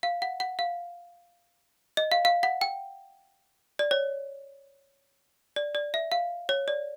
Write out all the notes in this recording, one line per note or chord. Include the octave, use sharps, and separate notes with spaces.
F5
F#5
F#5
F5
D#5
F5
F5
F#5
G5
D5
C#5
D5
D5
E5
F5
C#5
D5